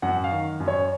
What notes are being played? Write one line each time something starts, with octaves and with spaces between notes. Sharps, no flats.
F#2 F#5
F5
D#3
F#2
C#5